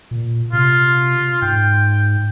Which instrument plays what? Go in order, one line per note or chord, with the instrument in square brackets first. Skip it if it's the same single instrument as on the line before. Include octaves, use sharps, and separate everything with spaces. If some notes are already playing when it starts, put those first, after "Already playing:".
[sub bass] A#2
[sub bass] C3 [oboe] F4
[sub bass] G#2 [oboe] G5